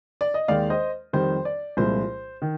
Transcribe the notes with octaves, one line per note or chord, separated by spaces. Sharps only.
D5
D#5
D#2 D#3 G#3 D5 F5
C5 D#5
F2 D#3 G3 C5
D5
C2 A#2 F3 G#3 C5
D#3